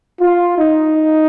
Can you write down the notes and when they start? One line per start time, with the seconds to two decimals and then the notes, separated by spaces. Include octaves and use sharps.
0.20 F4
0.58 D#4